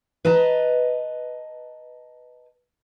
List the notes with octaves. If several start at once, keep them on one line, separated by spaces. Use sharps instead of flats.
B4 D#5 A5 A#5